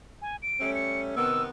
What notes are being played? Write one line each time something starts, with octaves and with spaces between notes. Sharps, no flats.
G#5
D7
G3 A3 C#4
C#7
C3 D#3 B3 E6